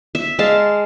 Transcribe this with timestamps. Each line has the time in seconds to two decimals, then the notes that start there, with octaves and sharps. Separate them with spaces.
0.15 E5
0.39 G#3 F5 A5